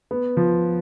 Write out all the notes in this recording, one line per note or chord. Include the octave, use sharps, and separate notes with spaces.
B3
F3